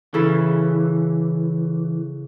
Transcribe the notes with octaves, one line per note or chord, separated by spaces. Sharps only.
C#3 E3 E4 A4